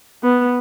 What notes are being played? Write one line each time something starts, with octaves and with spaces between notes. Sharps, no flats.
B3